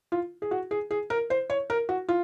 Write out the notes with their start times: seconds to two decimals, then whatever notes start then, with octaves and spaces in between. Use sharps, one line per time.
0.12 F4
0.42 G#4
0.51 F#4
0.71 G#4
0.91 G#4
1.10 A#4
1.30 C5
1.50 C#5
1.70 A#4
1.89 F#4
2.09 F4